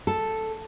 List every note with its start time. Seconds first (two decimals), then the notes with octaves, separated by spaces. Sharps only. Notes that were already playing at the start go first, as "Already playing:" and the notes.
0.07 A4